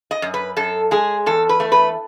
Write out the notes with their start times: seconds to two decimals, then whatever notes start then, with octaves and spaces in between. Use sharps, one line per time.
0.11 D#5
0.22 F#2
0.34 B4
0.57 F#2 A4
0.91 G#3 G#4
1.26 E2 A4
1.49 B4
1.60 A3
1.72 B4